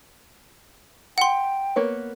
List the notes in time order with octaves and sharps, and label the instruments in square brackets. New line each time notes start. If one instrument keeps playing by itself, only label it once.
[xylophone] F#5 C6 [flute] G5
[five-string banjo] A#3 B3 C#5